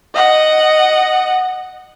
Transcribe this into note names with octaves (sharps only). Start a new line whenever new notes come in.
D#5 F#5